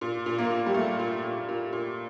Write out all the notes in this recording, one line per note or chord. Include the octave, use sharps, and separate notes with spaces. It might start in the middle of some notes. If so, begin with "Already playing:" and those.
A#2
A#2
A#3
A#2
G3
A#2 A3
A#2
A#2
A#2
A#2